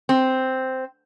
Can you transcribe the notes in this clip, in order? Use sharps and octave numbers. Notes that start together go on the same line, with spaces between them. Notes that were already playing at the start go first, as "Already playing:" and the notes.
C4